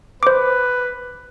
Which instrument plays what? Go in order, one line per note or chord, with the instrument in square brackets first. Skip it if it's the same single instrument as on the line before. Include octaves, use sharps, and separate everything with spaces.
[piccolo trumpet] B4 [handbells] C5 D6